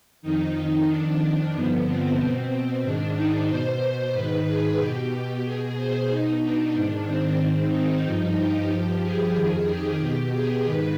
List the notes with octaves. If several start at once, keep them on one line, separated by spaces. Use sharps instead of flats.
F2 D#3 D#4
F2 D#3 D4
G2 D3 F3 B3
C4
B2
G#2 D#3 D4
D#4
B2 C5
G#2 D#3 B4
G#4
B2 G4
B2 G#4
C5
B2 D#4
D4
G#2 D#3
C4
G#2 D#3
D#4
G2 F3
G4
G2 F3
G#4
F2 D#3
G4
B2 G4
G#4
G#2 D#3 B4